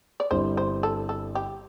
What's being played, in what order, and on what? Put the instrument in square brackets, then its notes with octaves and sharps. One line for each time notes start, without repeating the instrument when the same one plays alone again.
[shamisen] D5
[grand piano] G1 G2 G3 C4 E4 [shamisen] C5
[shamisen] C5
A4
A4
G4